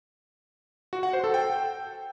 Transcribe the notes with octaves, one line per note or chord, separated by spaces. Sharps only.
F#4
F#5
C5
A4
G5